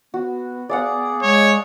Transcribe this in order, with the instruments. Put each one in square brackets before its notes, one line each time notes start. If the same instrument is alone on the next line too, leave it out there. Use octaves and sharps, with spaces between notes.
[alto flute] B3 [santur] F#4
[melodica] G#4 [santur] D5 F5 F#5
[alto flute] G#3 [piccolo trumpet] C#5